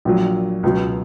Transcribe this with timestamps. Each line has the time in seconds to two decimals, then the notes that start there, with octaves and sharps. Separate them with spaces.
0.05 A#1 A#2 F#3
0.63 C#2 B2 F#3